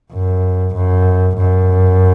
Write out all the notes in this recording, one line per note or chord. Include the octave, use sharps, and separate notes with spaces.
F#2
F#2
F#2